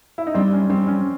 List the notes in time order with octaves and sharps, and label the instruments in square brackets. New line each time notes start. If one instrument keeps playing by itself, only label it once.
[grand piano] E4
D#4
[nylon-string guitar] G3 [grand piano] C4 D4
[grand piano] C#4
[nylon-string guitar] G3 [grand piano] C4
[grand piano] C#4